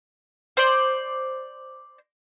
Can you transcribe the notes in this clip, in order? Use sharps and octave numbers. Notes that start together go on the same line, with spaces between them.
C5 D5